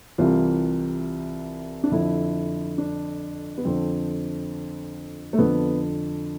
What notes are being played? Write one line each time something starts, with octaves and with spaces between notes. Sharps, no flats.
C2 C3 E3 F4
D4
F2 D3 E4
D4
B3
F2 D3 C4
A3
F2 D3 B3